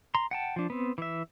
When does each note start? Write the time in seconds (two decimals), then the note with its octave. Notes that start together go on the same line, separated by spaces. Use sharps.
0.15 A#5 C6
0.31 F#5 G5 A5
0.56 F3 D4
0.70 B3 C4
0.98 E3 E5